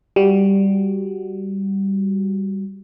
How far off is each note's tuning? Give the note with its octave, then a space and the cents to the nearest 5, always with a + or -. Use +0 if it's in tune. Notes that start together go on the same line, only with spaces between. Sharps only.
G3 +0 F#4 +0